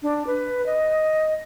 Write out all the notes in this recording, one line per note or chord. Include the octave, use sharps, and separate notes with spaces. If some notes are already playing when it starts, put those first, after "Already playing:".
D4
B4
D#5